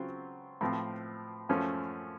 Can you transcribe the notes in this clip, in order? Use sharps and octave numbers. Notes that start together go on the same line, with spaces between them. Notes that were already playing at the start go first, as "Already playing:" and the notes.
Already playing: C#3 F#3 C4 F4
A2 F3 C4
F#2 F3 A3 C#4